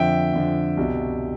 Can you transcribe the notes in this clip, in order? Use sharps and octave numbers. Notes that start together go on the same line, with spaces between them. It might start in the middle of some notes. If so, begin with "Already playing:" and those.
Already playing: F2 D3 F3 E5 G5
F2 D3 F3
C2 B2